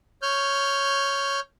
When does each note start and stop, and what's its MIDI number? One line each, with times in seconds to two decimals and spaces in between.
0.22 1.40 73
0.22 1.40 89
0.22 1.40 91